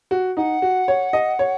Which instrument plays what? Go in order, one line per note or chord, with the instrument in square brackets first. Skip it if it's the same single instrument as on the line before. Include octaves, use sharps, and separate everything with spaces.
[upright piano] F#4
[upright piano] D#4 [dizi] F#5
[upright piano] F#4
C#5
D#5
C#5